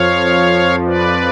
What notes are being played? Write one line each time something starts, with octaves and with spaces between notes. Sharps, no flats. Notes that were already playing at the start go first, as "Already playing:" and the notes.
Already playing: F2 F3 C#5 F5
B4 D5